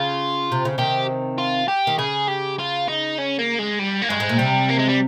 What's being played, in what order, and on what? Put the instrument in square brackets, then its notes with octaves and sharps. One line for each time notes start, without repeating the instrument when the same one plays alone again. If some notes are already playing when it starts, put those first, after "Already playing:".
Already playing: [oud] C#3 [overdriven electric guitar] F4
[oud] C3
C#3
[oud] C3 D#3 [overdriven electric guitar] G4
[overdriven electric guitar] F4
G4
[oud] D#3
[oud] C#3 [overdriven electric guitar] G#4
[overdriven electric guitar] G4
F4
D#4
C#4
A#3
G#3
G3
A#3
[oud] G2 [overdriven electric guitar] G#3
[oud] G#2
A#2
[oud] C3 [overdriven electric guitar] G3
[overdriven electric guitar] A#3
G#3
G3